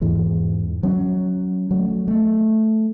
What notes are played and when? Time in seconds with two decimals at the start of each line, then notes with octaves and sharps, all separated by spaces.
0.01 E2 G#2 E3 G#3
0.83 F#3 C#4
1.71 F#3 A3
2.08 A3